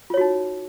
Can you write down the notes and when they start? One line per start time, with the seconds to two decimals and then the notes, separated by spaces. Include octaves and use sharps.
0.10 F4
0.14 C#5
0.17 F#4
0.21 D#4